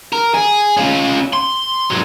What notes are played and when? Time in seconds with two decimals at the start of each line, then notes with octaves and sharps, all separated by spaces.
0.13 A#4
0.34 G#4
0.77 C#4 F4
1.33 C6
1.90 G#2 F#3